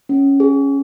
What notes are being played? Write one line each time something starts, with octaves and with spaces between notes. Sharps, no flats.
C#4
G#4